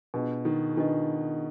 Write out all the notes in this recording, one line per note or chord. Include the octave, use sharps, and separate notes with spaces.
B2 D4 F4 G#4 B4 D#5
D#3
D#3 D4 F4 G#4 B4 D#5